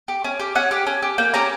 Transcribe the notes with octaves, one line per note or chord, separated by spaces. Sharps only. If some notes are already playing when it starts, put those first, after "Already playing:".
G4
C#4
G4
C#4 F#5
G4
C#4
G4
A#3 G5
C#4 G4 A#5